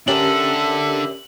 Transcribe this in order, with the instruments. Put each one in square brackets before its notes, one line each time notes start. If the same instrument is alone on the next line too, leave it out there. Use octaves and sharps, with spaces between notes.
[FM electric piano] C#4 G4 A#4 [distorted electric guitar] D4 A4 [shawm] E5 [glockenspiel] F#7